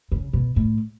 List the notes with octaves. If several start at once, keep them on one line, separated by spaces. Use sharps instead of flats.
C#3
B2
A2